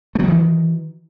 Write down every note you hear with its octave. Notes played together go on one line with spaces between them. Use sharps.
D#3 E3 F#3 A3